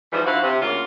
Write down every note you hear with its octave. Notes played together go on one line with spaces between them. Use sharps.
G#2 E3 F3 G3 C5
D3 F3 E4 F#4 F5
C3
D2 C#3 A#3 F4